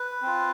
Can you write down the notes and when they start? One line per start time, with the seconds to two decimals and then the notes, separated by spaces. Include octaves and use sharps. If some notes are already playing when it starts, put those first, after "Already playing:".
Already playing: B4
0.22 C4 F4